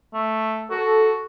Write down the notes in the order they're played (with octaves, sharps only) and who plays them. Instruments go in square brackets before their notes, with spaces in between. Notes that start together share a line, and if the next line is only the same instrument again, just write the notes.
[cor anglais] A3
[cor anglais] F#4 [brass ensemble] A4